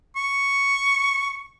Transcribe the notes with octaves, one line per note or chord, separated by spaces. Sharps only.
C#6